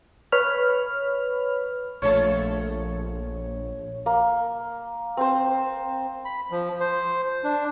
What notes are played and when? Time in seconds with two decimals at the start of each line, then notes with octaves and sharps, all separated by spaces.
0.32 B4 C#5 B5 F6
2.02 A#1 F3 A3 A4 C#5
4.06 A#3
5.17 C4 C5
6.25 B5
6.51 F3
6.80 C5
7.44 D4